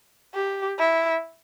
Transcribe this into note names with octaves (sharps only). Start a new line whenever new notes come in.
G4
E4